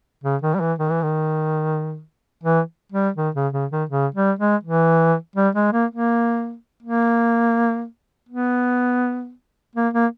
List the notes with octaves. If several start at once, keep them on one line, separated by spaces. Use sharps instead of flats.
C#3
D#3
G3
E3
D#3
E3
D#3
E3
G3
D#3
C#3
C#3
D#3
C#3
G3
G#3
E3
G3
G#3
A#3
A#3
A#3
B3
A#3
A#3